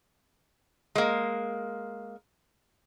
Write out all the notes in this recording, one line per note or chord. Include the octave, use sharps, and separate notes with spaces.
G#3 A#3